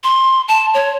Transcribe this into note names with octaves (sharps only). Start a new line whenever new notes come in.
C6
A5
C#5